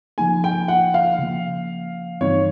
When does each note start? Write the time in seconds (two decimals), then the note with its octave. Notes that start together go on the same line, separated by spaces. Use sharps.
0.18 C#3 F3 A#3 D#4 G#5
0.44 G5
0.68 F#5
0.94 F5
1.19 C#3 F3 A#3
2.20 G2 E3 G3 C4 D#4 C#5